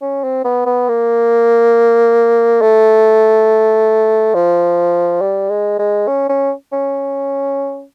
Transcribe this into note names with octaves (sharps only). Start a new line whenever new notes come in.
C#4
C4
B3
B3
A#3
A3
F3
G3
G#3
G#3
C#4
C#4
C#4